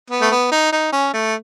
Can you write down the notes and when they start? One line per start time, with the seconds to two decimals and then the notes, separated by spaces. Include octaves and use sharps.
0.11 B3
0.21 A3
0.31 B3
0.52 D#4
0.73 D#4
0.93 C#4
1.14 A3